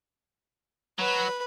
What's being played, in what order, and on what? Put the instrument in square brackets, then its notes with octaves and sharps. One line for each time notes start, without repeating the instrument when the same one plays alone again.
[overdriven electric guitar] F#3 [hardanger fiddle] B4